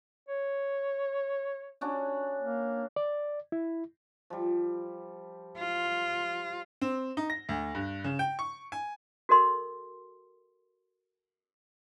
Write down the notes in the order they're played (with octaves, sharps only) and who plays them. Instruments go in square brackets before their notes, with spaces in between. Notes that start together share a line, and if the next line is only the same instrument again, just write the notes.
[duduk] C#5
[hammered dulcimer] C#4 D4 F#4
[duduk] A#3
[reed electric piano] D5
E4
[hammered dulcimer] F3 G3
[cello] F4
[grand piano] C4
D#4
A#6
D2
G2
C#3
G5
C#6
G#5
[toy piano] F#4 A4 A#4 D#5 C6